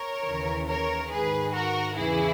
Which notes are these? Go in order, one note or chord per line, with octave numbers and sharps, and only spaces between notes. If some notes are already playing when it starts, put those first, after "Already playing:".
Already playing: A#4 C#5
D#2 C#3 E3
A#4 C#5
G#2 D#3 G#4 B4
F#4 A#4
E2 C#3 E3 E4 G#4